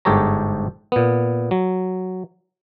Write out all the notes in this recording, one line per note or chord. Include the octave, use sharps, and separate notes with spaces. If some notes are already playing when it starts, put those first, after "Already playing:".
G1 G#2 G4 A4 C#5 A#5
A#2 B3
F#3